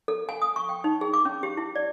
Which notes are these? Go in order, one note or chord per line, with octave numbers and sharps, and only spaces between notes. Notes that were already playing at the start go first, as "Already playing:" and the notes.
A4
G#5
D#6
C#6
G5
D#4
G#4
D6
C#4
G4
E4
D5